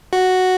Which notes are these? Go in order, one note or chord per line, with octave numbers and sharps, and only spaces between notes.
F#4